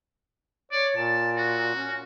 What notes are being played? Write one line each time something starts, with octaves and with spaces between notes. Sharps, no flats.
C#5 D5
A#2 A5
F#4
C#4